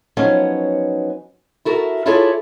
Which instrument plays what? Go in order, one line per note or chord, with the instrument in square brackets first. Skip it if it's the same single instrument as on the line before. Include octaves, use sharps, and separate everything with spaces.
[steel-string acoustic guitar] F3 F#3 B3 C#4 D#4
E4 F#4 A4 A#4
E4 F4 G#4 A4 C#5 D5